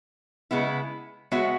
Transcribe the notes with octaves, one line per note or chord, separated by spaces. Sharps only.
C#3 G#3 B3 E4
G#3 B3 F#4 C#5 E5